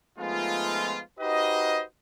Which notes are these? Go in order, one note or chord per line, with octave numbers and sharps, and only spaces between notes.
F3 G#3 A3 B3 D#4 F4
D#4 F#4 G4 B4 C5 D#5